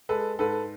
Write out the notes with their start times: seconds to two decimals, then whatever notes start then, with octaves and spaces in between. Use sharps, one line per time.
0.09 G#3 A4 B4
0.39 G#2 A4 B4